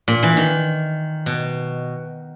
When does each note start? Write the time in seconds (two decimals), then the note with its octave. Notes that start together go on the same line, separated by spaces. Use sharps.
0.08 A#2
0.23 E3
0.37 D#3
1.26 B2